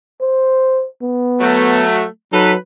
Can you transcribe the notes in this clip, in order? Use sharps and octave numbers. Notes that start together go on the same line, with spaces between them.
C5
B3
F#3 A3
F#3 D#4 A4 B4